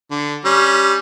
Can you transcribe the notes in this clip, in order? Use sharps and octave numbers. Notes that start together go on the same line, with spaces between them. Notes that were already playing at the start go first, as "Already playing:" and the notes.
D3
G3 C#4